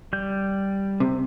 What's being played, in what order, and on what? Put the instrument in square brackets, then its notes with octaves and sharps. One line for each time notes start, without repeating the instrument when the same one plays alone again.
[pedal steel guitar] G3 G6
[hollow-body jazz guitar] C3